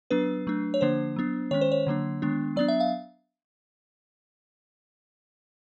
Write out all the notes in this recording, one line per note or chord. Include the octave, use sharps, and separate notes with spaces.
F#3 B3 D4 B4
F#3 A3 D4
C#5
D3 F3 A#3 D4 C5
F#3 B3 D4
D#3 G#3 C#4 C#5
C5
C#5
D3 F#3 A#3 D4
D#3 G#3 B3 D4
F#3 B3 D4 D5
E5
F5